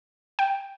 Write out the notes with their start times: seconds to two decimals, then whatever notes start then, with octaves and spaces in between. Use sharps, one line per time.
0.39 G5